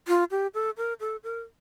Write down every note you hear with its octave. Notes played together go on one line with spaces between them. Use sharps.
F4
G4
A4
A#4
A4
A#4